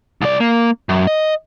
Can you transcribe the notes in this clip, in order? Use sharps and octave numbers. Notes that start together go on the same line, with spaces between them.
C2 D5
A#3
F#2
D#5